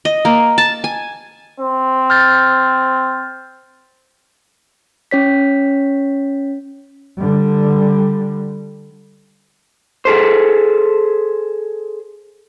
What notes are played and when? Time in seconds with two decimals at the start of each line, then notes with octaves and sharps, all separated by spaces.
0.05 D#5
0.25 A#3
0.58 A5
0.84 G#5
1.60 C4
2.10 F6 G6 A6
5.11 C#4 C#5 B6
7.18 D3 G3
10.05 G#4 A4 C5